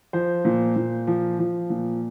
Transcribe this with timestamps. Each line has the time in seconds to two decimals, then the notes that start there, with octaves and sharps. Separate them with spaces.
0.13 F3 C5
0.45 A#2
0.76 A#2
1.07 F3
1.39 F3
1.70 A#2